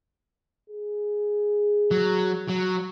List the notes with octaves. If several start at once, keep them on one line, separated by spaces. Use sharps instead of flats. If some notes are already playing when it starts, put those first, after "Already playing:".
G#4
F#3
F#3